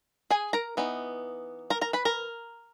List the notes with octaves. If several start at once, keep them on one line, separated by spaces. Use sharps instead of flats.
G#4 G#5
A#4 A#5
E3 B3 D#4
A#4 A#5
A#4 A#5
B4 B5
A#4 A#5